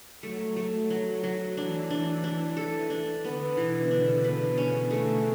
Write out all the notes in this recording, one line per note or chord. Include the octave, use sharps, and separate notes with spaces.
F#3 A3
A3
F#3
F#3
E3 D4
D4
D4
A4
D4
D3 B3
B2 E3
C#3 D4
B4
C#4
A3